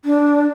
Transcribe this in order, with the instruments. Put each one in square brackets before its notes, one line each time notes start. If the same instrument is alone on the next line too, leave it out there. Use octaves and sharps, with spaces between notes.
[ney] D4